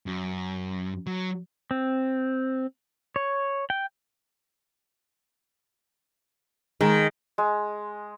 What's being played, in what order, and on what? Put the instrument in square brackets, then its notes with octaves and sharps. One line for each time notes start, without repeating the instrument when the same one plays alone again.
[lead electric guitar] F#2
F#3
[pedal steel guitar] C4
C#5
G5
[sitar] D#3 [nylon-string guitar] G#3
[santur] G#3